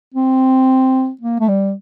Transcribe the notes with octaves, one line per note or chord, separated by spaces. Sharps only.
C4
A#3
A3
G3